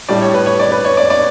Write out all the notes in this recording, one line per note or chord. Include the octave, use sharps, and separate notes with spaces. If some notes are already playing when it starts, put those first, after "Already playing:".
A2 G3 D5
C#5
B4
C#5
D5
B4
C#5
D5
D5